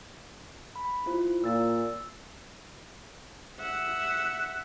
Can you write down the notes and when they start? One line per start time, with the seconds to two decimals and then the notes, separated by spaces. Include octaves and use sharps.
0.76 B5
1.06 E4 F4 C5
1.44 A#2 E6 A6
3.60 E5 F#5